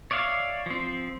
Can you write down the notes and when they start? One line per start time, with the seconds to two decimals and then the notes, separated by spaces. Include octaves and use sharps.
0.11 C#5 D5 E5 F5
0.66 F3 C4